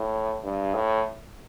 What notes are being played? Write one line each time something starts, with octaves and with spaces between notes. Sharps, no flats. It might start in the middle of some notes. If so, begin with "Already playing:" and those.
Already playing: A2
G2
A2